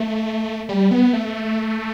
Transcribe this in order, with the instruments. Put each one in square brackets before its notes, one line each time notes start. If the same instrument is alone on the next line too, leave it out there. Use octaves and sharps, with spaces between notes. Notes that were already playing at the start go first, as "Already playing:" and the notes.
Already playing: [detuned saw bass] A3
G3
B3
A3